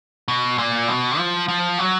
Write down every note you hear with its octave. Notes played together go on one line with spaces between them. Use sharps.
B2
A#2
B2
F3
F3
F#3